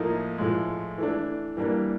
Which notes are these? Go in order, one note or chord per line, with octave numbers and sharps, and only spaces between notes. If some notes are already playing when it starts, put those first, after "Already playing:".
Already playing: A2 F3 A#3 D#4
A2 F3 G#3
E3 A3 D4
E3 G3 A#3 D4